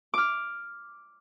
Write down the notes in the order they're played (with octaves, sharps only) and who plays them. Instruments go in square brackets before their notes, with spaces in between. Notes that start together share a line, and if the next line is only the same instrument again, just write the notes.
[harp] D6 F6